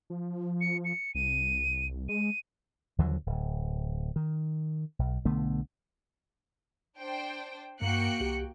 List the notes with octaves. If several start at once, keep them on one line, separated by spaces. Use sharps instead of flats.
F3
C#7
C#7
C2 D#7
G#3 D#7
D#2 D3 F3 F#3
D1
D#3
B1
B1 D3 A3 B3
D4 C5 G5
G2 A#3 F#4 G5 F#6 C#7
C2 G4